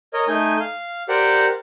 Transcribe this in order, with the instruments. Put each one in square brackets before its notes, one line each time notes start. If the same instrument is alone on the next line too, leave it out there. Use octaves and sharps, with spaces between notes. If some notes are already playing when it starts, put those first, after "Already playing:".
[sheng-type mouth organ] A#4 C#5 D#5
A3 D#4 G#5 G6
F5
G4 A#4 C5 D5 F#5